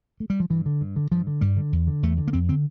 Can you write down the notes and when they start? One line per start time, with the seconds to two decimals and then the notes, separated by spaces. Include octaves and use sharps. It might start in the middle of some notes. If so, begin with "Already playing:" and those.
0.20 A3
0.30 G3
0.40 F3
0.50 G2 E3
0.66 D3
0.81 G2
0.96 D3
1.12 G2 F3
1.27 D3
1.41 G2 G3
1.57 D3
1.72 E2
1.87 D3
2.03 E2 A3
2.18 D3
2.27 A#3
2.33 F2 C4
2.49 D3 C4